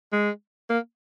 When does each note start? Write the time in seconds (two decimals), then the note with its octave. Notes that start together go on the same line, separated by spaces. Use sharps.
0.13 G#3
0.70 A#3